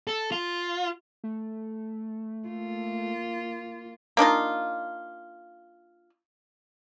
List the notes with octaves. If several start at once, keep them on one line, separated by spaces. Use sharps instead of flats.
A4
F4
A3
A#3 F4
A#3 D4 D#4 F4